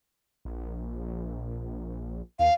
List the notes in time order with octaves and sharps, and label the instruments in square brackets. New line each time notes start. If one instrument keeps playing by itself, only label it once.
[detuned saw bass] A#1
[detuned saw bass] D#2 [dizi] F5